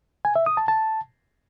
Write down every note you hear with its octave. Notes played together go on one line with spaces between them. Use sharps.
G#5
E5
D#6
A5
A5